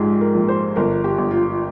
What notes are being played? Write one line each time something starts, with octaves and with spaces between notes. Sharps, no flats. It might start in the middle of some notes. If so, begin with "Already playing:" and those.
Already playing: A#1 G#2 F3 G4 G#4
A#4
A#1
C5
G1 A#4
G4
G1
F4